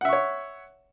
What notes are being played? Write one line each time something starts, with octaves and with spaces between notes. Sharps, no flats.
C#5 E5 F#5 C#6